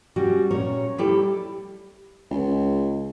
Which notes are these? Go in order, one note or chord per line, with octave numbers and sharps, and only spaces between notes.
G3 C#4 F#4
A#2 C#4 C#5 A#5
G3 E4 G4 A4
C#2